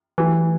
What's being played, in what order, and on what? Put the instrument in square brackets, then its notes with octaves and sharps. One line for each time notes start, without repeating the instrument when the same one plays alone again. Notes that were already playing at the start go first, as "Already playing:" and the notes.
[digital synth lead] E3 [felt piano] F#3 A3 E4 G4